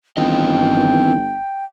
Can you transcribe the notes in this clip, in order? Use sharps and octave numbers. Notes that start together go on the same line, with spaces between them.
G1 D#3 E3 C4 F4 D#5 G5